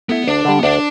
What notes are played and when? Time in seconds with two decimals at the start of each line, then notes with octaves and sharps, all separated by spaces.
0.09 A3 B3 E4
0.27 D2 D4
0.45 D3 G3
0.59 B3
0.63 D2 D4